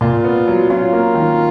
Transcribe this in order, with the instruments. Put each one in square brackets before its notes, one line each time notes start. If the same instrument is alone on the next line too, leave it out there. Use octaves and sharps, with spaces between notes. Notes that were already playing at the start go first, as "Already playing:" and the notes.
[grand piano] A#2 [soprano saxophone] F4
[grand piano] B3
F#3
[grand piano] C#4 [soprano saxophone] F4
[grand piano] A#3
D#3